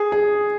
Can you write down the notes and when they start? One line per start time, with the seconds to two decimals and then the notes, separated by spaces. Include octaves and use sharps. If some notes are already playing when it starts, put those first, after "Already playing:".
Already playing: G#4
0.12 G#4